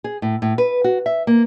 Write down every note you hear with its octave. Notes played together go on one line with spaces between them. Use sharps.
G#4
A2
A2
B4
F#4
E5
A#3